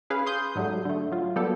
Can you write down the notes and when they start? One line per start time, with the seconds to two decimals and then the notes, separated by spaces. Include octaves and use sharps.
0.10 C#4 G#4 B4 F5
0.26 C6 D#6 G6
0.55 G#2 F#3 G3 A3
0.85 D3 A3
1.12 F#3 F4
1.36 F#3 G3 A#3 B3 G4 A4